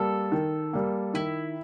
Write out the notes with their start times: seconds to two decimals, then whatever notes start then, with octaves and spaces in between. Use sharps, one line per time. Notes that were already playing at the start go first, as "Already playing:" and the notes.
Already playing: G3 A#3 A4
0.32 D#3
0.73 G3 A#3
1.14 D#3 E4